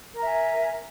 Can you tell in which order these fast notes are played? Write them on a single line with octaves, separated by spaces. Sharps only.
A#4 A#5 E5 G#5